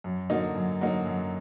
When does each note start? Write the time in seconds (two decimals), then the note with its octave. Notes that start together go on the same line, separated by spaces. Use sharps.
0.04 F#2
0.30 D3 F#3 A#3 D#4
0.55 F#2
0.81 D3 F#3 A#3 D#4
1.06 F#2